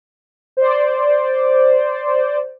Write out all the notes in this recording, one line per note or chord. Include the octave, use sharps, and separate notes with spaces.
C5 D5